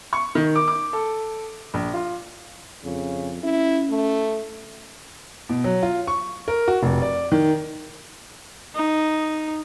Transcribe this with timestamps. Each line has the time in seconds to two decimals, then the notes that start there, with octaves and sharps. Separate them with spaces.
0.13 C#6
0.35 D#3
0.56 D6
0.68 D6
0.93 A4
1.74 A#1
1.94 F4
2.84 F2 C#3
3.44 C#4 E4
3.90 A3
5.49 B2
5.64 F#3
5.83 F4
6.07 C#6
6.48 A#4
6.68 F#4
6.83 F1
7.02 D5
7.32 D#3
8.75 D#4